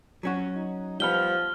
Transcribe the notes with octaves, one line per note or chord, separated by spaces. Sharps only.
F#3 C#4 F#4
D#4
F3 G3 B3 B5 F6 G7